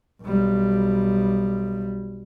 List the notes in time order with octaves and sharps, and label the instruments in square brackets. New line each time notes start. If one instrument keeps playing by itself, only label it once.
[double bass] B1 G3